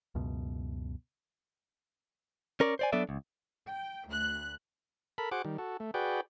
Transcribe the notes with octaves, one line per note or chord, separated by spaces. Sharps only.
C#2 F#2 B2
C#4 A#4 C#5 D5
C5 D5 G#5
F#3 B3 D4 A4 D5 E5
C#2
G5
D2 F#6
A4 A#4 B5
F#4 G#4 C5 F#5 D6
D#3 G3
F#4 A4
A3
F#4 G#4 B4 D5 G5